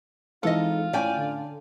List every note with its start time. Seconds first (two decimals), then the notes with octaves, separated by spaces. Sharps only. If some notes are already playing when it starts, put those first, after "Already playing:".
0.43 E3 G#3 C4 D#4 F4 A4 D#5
0.93 A2 C#4 E4 D5 G5 G#5
1.15 D3